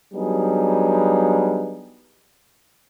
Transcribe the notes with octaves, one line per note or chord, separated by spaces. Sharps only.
F#3 G3 B3 D4 D#4 G#4